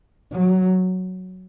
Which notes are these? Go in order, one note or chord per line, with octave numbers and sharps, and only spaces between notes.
F#3